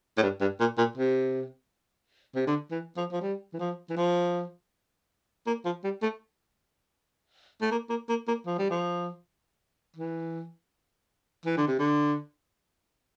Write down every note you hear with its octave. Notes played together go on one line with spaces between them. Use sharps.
A2
G2
G2
A#2
A#2
C3
C3
D3
E3
F3
F3
G3
E3
F3
E3
F3
A#3
F3
G3
A3
A3
A#3
A#3
A#3
A#3
F3
G3
F3
E3
E3
D3
C3
D3